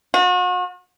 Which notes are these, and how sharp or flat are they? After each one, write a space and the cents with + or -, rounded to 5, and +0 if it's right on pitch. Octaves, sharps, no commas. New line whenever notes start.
F#4 -40